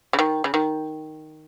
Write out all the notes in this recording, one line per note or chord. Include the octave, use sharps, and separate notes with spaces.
C#3
D#3
C#3
D#3